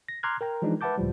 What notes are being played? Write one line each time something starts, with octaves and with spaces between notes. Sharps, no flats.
A#6
A#5 C6 D6 F6 F#6 G#6
A#4 G5 A#5
E3 F3 G#3 D4 D#4
B4 E5 F#5 A5 D6 G6
C#2 A2 F3 G3